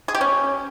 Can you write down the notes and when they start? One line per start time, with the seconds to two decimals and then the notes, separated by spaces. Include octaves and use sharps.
0.08 G#4
0.15 G4
0.21 C#4